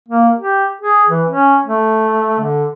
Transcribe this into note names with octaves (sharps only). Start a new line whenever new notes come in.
A#3
G4
G#4
E3
C#4
A3
D3